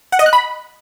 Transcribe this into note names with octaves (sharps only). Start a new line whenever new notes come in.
F#5
D#5
F#6
B5